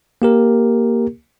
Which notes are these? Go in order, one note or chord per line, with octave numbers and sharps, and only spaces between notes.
A#3 G4 A#4